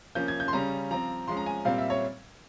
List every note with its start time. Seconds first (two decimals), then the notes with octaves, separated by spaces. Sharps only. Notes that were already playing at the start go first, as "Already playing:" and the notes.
0.15 F3 A#3 C#4 G6
0.28 G#6
0.40 G6
0.48 C6
0.53 C#3 G3 C#4 A#5
0.91 F3 C4 A#5
1.28 F3 G#3 C#4 C6
1.37 A#5
1.46 G#5
1.65 A#2 G3 C4 F5
1.78 E5
1.90 C#5